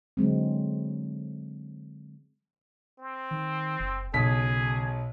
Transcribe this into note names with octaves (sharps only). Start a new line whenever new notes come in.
D3 F#3 G#3 C4
C4
D#3
F#1
B1 C#3 G#4 B6